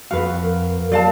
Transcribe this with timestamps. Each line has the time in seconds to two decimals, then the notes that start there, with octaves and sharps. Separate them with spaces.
0.11 F2 F#4 B4 F5
0.43 A#4
0.92 F#3 D5 F5 A5